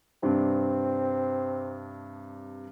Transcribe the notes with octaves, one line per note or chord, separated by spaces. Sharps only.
G2 C3 C4 D4